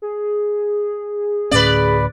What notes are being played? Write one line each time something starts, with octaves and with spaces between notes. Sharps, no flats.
G#4
D2 A2 C#4 B4 D5